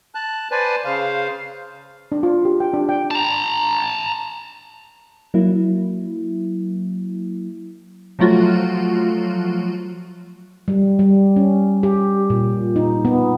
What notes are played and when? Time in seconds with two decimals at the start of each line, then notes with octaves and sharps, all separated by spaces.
0.15 A5 F#6
0.52 B4 C5 D5 G#5 A5
0.85 C#3 C5 F5
2.12 D4
2.23 F4
2.45 G4
2.60 G5
2.74 D4
2.89 G5
3.11 A5 A#5
5.34 F#3 A#3 E4
8.19 F3 F#3 A3 F4 F#4
10.68 G3
10.99 G3
11.36 C#4
11.83 G4
12.30 A#2
12.76 D#4
13.05 B3